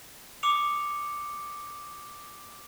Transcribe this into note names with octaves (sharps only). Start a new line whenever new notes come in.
D6 D#6 C#7 F7